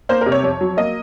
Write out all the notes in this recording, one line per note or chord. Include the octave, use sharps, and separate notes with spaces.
A#3 C5
C3 A#4
C#5
F2 C#5
F#3
A#3 D#5